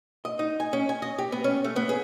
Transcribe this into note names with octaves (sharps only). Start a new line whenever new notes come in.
D#5
D#4
G#5
C#4
G#5
D#5
G4
B3
C#4
A3
B3
G#4